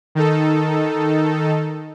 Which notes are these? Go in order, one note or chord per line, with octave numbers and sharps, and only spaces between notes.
D#3 D#4 A4